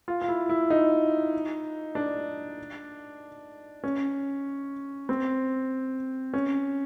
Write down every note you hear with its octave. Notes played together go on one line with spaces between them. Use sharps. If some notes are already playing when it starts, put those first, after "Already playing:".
F4
F4
E4
E4
D#4
D4
C#4
C4
C#4